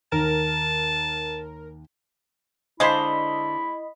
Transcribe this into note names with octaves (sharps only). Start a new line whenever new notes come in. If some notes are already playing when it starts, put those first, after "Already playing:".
D#2 A#4 A5
D3 G#3 E4 C5 D#5 F5 A5 B5